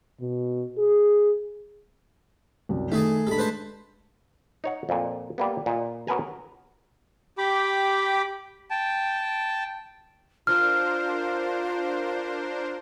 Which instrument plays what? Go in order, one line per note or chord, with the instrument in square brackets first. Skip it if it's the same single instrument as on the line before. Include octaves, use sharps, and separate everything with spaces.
[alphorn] B2
G#4
[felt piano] C2 F#2
[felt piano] D#3 [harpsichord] A3 G#4 A5
[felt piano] G#3 A3 D4 [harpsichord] A4 B5
[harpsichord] B4 C5 A5
[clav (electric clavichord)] D#4 C#5 F#5
F2 A#2
G3 A#3 B3
A#2 D#5
F#3 B3 A#4 B4 G#5 A#5
[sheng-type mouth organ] G4 G5 B5 D6
G5 A5
[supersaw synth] D4 A#4 C5 [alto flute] F4 [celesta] F6